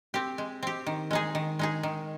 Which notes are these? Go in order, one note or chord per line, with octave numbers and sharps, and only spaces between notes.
C4 G4
G#3
C4 G4
D#3
G#3 D#4 G#4
D#3
G#3 D#4 G#4
D#3